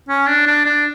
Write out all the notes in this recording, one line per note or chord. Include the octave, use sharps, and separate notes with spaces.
C#4
D4
D4
D4